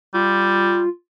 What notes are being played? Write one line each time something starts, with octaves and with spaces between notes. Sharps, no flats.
G3 F4